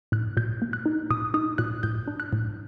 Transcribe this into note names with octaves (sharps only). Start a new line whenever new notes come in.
A2 F#6
A#2 G6
A#3
F#6
D#4
A#2 D#6
D#4 D#6
A#2 F#6
A2 G6
D4
F#6
A2